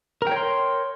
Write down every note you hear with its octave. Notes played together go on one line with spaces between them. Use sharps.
A#4 C#5 G5 C6